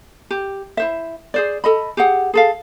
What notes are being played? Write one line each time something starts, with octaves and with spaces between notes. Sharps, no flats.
G4
E4 C5 E5
G#4 C5 D5
A4 D#5 B5
G4 G#4 F#5
G#4 A4 F5